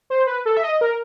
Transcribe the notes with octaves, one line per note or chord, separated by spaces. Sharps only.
C5
B4
A4
E5
D#5
A#4